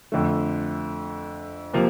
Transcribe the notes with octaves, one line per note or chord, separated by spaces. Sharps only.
F2 D3 A3
C3 F3 A#3